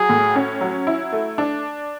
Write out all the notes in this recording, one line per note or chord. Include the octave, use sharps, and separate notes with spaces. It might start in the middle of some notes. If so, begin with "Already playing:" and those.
Already playing: F#3 G#4
A2
C#4
F#3
E4
A3
D4